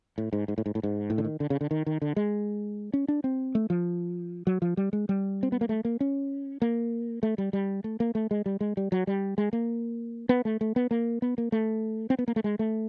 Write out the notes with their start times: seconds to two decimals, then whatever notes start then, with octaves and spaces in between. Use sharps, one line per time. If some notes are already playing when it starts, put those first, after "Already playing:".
0.18 A2
0.33 G#2
0.48 G#2
0.58 A2
0.66 G#2
0.75 A2
0.83 G#2
1.10 A2
1.18 D3
1.25 D#3
1.40 D3
1.50 C#3
1.61 D3
1.71 D#3
1.86 D#3
2.02 D3
2.16 G#3
2.94 C#4
3.08 D4
3.24 C4
3.55 A3
3.70 F3
4.47 F#3
4.62 F3
4.77 G3
4.93 G#3
5.09 G3
5.43 C4
5.52 B3
5.61 A#3
5.69 A3
5.85 A#3
6.00 C#4
6.62 A#3
7.23 A3
7.38 G3
7.53 G3
7.84 A3
8.00 A#3
8.15 A3
8.31 G#3
8.46 G3
8.61 G#3
8.77 G3
8.92 F#3
9.07 G3
9.38 G#3
9.53 A#3
10.29 B3
10.45 A3
10.61 A3
10.76 B3
10.91 A#3
11.22 B3
11.38 A#3
11.52 A3
12.10 C4
12.19 B3
12.28 A#3
12.36 A3
12.44 G#3
12.59 A3